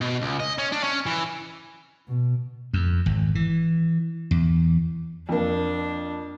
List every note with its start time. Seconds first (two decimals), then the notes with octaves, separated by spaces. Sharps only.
0.01 B2
0.21 C#2
0.40 D#5
0.58 C#4
0.72 D4
0.84 C#4
1.06 E3
2.07 B2
2.73 F2
3.06 G#1
3.35 E3
4.31 E2
5.29 F2 A#3 D4